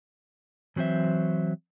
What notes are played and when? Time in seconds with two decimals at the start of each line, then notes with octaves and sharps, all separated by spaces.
0.76 E3 F#3 C4 C5 E5